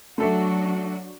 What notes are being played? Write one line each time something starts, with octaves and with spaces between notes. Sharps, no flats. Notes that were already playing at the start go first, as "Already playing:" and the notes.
F#3 A3 D4 F#4 A4 E5